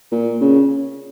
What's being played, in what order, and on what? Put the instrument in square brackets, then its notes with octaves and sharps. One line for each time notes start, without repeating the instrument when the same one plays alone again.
[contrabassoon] A#2
C#3